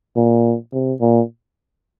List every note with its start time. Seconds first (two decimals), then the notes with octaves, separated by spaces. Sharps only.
0.17 A#2
0.73 C3
1.01 A#2